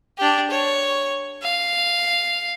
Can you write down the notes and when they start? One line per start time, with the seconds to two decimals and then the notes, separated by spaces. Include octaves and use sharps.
0.18 D4 G4
0.50 C#5
1.42 F5